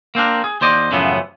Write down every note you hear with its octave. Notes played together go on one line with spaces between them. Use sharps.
A#3 C4 D4 A#4
G#4
D#2 C5 D5 D#5
F#2 A2 C#3 E3 F3 B3